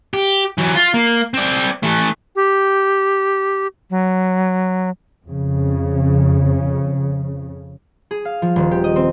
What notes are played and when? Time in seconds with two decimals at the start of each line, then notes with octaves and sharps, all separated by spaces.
0.14 G4
0.58 E3 F#3
0.75 F4
0.94 A#3
1.34 C4 D5
1.83 E3 A3
2.36 G4
3.90 F#3
5.27 F2 C#3
8.11 G#4
8.25 F5
8.42 F3
8.56 D#1
8.71 G4
8.84 D#5
8.96 C4